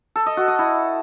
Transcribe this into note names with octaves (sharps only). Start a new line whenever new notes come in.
A4
D#5
F#4
D#5
E4